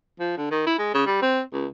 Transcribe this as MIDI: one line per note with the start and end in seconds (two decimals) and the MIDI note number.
0.20 0.35 53
0.38 0.50 50
0.51 0.65 51
0.66 0.74 64
0.79 0.93 56
0.95 1.06 49
1.06 1.20 55
1.22 1.42 60
1.53 1.67 37